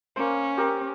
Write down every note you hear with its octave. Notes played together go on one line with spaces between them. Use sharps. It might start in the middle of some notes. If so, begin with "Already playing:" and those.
A#3 C#4 C5
G4 A#4 E6